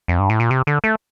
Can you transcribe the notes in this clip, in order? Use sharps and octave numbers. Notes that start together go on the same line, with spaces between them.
F2
G2
A2
A#2
C3
D3
A3